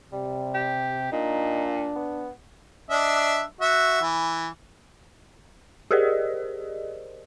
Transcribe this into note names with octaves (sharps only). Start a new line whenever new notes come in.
C3 G3
G4
A#2 D4 D#4
B3
D4 D#5 E5
F#4 E5
E3
G4 G#4 A#4 C5 D5 D#5